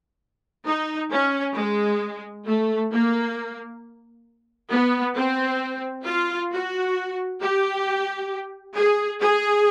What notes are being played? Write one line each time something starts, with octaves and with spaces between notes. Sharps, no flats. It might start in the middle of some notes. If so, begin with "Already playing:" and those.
D#4
C#4
G#3
A3
A#3
B3
C4
F4
F#4
G4
G#4
G#4